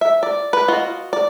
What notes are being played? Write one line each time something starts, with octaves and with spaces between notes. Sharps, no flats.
E5
D5
B4
F4 F#4 D#5
D5